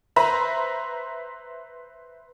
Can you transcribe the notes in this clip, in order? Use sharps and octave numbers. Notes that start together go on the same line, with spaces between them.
B4 C5 E5 A#5 B5